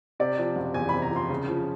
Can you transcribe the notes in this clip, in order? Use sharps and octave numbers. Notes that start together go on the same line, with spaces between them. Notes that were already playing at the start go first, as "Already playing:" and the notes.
C3 D5
F3
F#1
E2 G#5
B5
C3
A#5
F3 C6
C#3
F3